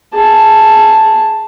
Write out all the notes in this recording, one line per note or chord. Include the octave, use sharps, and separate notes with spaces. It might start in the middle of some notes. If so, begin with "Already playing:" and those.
G#4 A5